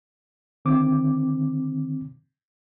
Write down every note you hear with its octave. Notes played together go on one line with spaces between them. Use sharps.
D3 D#3 C4 D6